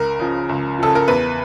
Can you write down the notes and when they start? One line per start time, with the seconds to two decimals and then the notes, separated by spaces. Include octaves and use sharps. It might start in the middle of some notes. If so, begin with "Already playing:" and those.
Already playing: C#2 A#4
0.19 C#3 F3
0.49 C#2
0.79 C#3 F3 A4
0.95 A#4
1.08 E2 B4